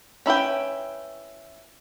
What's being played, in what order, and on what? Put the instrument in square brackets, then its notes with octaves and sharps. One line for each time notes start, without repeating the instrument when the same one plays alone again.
[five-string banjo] C#4 E4 B4 G5